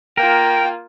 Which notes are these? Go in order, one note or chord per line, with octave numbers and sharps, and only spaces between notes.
A#3 F4 A#4 G5